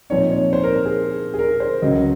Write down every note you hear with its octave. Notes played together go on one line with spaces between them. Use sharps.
A#2 F3 C4 D#4 C#5
C#5
C5
A#4
A#4
G#4
G#4
A#4
C5
C#2 C#3 F#3 C#4 D#5